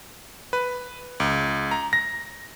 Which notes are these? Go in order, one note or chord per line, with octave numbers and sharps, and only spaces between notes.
B4
C#2
A#5
A#6